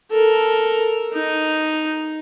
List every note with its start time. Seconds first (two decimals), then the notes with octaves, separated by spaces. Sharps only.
0.11 A4 A#4
1.13 D#4